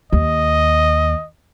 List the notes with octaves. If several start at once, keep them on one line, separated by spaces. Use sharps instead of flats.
D#2 D#5